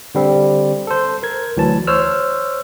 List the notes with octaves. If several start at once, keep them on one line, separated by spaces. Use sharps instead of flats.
D3 G3 C4
A4 C5
A#4 G#6
D2 E3 F#3 A5
C5 C#5 E6 F6